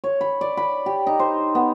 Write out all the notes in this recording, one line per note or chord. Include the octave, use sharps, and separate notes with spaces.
C#5
B5
D5
B5
G4
D#4
C5
B3